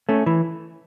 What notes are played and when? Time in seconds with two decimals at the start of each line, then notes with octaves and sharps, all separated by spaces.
0.09 A3 C#4
0.26 E3